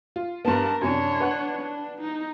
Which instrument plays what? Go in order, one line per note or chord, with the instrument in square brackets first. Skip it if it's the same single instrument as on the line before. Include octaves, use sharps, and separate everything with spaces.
[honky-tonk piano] F4
[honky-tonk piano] G2 B3 [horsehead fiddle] A#4 A5
[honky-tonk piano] F#2 C3 [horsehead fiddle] D4 C#5
[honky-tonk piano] B4 F#5 F#6
[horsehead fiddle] D4
D#4